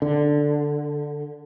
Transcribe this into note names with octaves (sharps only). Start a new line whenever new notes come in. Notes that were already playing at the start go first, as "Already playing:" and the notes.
D3